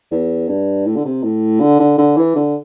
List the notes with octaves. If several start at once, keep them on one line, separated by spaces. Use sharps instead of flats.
E2
G2
A2
D3
C3
A2
D3
D3
D3
E3
D3